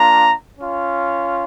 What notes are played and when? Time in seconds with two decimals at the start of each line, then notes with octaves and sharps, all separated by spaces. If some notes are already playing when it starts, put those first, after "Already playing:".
Already playing: A#3 D4 F4 A#5
0.58 C#4 F4